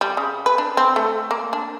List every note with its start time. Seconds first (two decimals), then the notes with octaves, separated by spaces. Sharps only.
0.01 G3
0.17 C#3
0.46 B4
0.58 D4
0.77 C4
0.96 A3
1.31 A#3
1.53 D4